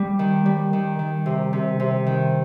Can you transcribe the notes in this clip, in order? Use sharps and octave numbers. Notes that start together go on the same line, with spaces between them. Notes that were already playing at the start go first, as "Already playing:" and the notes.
Already playing: G3
D#3
G3
D#3
D#3
C3
C3
C3
D#3